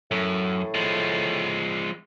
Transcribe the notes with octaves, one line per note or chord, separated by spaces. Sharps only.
F#2 A2
F3 G#3